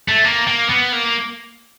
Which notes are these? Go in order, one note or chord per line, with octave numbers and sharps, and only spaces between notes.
A3
A#3
A#3
B3
A#3